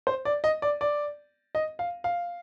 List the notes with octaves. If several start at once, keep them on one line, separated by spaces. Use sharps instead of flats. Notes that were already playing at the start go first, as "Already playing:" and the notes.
C5
D5
D#5
D5
D5
D#5
F5
F5